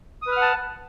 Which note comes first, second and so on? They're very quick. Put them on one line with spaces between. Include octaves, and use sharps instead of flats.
D#6 B4 F6 F#5 A5